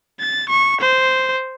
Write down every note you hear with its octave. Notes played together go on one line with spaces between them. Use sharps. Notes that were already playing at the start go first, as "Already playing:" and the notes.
A6
C#6
C5